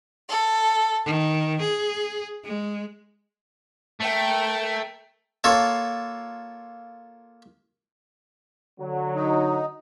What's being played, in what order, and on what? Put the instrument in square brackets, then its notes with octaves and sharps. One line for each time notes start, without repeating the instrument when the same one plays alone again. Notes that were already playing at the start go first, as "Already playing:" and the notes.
[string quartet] A4
D#3
G#4
G#3
[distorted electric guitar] A3 [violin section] A#4 G5
[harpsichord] A#3 F4 A4 C#5
[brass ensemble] D3 F#3
[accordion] D#4